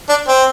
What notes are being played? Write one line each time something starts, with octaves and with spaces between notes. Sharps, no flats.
D4
C4